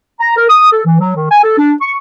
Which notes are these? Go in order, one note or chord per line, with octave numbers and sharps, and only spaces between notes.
A#5
A#4
D#6
A4
E3
F#3
D#3
G#5
A4
D4
C#6